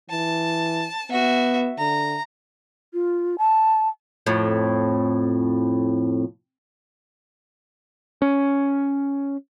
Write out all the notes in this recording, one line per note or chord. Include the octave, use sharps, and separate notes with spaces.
E3 A5
B3 F#4 E5
D3 A#5
F4
A5
F2 A2
C#4